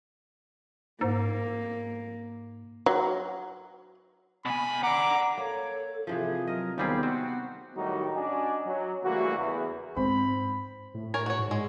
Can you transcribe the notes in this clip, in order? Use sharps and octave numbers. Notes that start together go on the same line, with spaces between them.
G#2 A#3
F#3
B2 G#5 B5
D5 F#5 A#5 D6
A#3 A4 C#5
C3 E3 F3 G#4
F#3 A#4 D#5
D#2 G3 B3 D#4 G4 G#4 C5
C4 F#4
A2 D#3 F#3 G3 D#4 F#4
C#4 D4 F#4 D5 D#5 G#5
F#3
C#3 E3 G3 A3 A#3 F#4
E2
G#2 C4 B5
A2
A#4 C#5 G#5
F#4 C#5
G#2
G#3